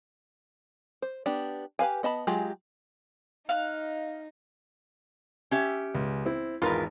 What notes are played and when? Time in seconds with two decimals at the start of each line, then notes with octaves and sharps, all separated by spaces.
1.02 C5
1.26 B3 D4 G4
1.79 G4 B4 F5 G#5
2.03 B3 D#5 A5 B5
2.27 F#3 G#3 F4 G4 G#4
3.49 D#4 F5 F#6
5.51 C#4 G4 E5
5.95 C#2
6.26 C4 E4
6.62 G#1 E2 F4 A#4 B4 C6